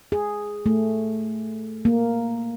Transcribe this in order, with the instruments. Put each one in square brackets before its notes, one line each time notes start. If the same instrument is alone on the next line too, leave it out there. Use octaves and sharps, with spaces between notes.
[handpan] G#4
A3
A#3